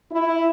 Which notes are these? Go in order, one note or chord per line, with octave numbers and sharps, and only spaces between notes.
E4